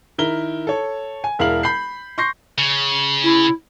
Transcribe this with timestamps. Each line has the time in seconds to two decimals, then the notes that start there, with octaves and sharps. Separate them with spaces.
0.18 D#3 E4 A#4 G7
0.67 A4 C#5
1.24 G#5
1.39 E1 E4 A#4 F5 F6 F#7
1.63 B5 G6 C7
2.18 C6 C#6 G6 A#6 C7
2.58 C#3
3.23 E4